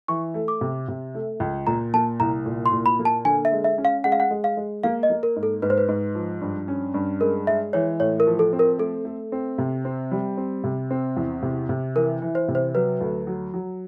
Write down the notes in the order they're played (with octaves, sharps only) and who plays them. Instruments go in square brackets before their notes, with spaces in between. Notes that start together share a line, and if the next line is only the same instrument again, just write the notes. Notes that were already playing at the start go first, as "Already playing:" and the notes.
[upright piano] E3 [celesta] C#6
[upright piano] A3
[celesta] D6
[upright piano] C3
C3
A3
C#2
[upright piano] A#2 [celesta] A#5
[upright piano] A#3 [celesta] A5
[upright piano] C2 [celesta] A#5
[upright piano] A#2
[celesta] C6
[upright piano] A#2
[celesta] B5
[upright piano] A#3
[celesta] A5
[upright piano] D3 [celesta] G#5
[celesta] E5
[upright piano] G#3
[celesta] E5
[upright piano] C#4
[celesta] F5
[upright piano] G#3 [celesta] F#5
[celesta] F5
F#5
[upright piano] G#3
[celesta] F5
[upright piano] G#3
[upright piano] A#3 [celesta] F5
[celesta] D#5
[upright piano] A#3
[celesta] A#4
[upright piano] G#2
[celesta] A4
[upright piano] G#2 [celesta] B4
[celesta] C5
B4
[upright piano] G#2
F3
G2
C#4
G2
[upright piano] G#3 [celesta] A#4
[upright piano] G#3 [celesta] E5
[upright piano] E3 [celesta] C#5
[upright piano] A2 [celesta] C#5
[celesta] A#4
[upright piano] F3
[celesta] A4
[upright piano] C4
[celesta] A#4
[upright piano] A3 [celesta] A4
[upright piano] A3
C4
C3
C4
G3
C4
C3
C4
E2
C3
C3
[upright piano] E3 [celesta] A#4
[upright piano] E3
[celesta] C5
[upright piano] C3
[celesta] C5
[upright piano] F#3 [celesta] B4
[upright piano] D2
F#3
F#3